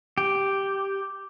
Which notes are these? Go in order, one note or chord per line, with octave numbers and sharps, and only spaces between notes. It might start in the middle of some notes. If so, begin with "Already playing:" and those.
G4